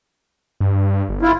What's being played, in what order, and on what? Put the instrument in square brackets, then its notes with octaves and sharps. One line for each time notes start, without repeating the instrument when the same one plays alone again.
[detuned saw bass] G2
G1
[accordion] E4 F4